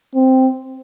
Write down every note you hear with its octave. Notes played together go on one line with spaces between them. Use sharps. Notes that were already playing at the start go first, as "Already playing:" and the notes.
C4